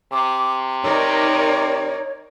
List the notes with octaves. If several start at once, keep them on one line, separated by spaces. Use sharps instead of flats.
C3 D6
D#4 A#4 C#5 D5